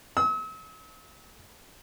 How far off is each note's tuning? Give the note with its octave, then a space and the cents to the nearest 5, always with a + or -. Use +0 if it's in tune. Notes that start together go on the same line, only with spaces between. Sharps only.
E6 -45